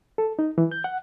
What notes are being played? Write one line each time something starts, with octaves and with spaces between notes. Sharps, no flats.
A4
D#4
E3
G6
F#5